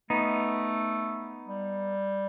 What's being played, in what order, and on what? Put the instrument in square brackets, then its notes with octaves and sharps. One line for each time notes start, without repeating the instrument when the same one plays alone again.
[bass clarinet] A3 [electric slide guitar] B3 D#4
[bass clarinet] G3